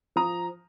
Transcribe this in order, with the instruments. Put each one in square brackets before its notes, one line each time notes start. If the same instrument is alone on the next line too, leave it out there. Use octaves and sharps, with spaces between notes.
[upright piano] F3 A#5 D#6